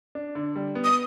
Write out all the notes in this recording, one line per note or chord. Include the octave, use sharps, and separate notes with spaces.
D4
D3
G3
B3
D#6